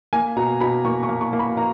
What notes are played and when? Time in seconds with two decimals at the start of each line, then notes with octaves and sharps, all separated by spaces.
0.13 A#3 G#5
0.36 B2 A#5
0.61 B2 B5
0.85 A#3 C#6
1.03 C#6
1.09 A#3
1.21 C#6
1.33 A#3
1.39 B5
1.57 A#3 A#5